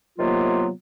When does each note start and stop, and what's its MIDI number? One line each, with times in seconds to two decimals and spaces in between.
0.18 0.69 48
0.18 0.69 51
0.18 0.69 54
0.18 0.69 58
0.18 0.69 59
0.18 0.69 65